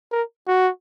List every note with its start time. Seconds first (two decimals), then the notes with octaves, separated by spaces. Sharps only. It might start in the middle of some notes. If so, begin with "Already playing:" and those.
0.12 A#4
0.48 F#4